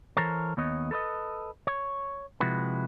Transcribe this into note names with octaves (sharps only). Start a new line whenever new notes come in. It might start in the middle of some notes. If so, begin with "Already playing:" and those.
E3 A4 A#4 C5 C#5
D#2 B3 C#5 D#5
A4 B4 D5 D#5
C#5
C3 F3 G#3 E4 F#4 B4